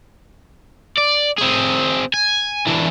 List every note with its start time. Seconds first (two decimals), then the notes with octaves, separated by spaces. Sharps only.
0.98 D5
1.38 C4 G#4
2.14 G#5
2.67 E3 D4